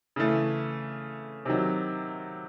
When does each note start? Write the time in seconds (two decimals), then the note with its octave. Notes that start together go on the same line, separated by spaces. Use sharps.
0.16 C#3 E3 A3
1.46 C3 D#3 F#3